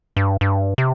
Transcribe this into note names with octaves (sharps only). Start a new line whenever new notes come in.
G2
G2
C3